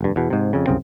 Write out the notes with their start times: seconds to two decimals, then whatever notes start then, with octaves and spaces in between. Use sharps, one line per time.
0.01 F1 G2
0.16 E2 B2
0.30 G#2 C3
0.53 F2 C#3
0.67 C2 F#2 C#3 C4